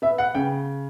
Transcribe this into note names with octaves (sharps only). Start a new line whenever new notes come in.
B3 E5
F#5
C#3 G5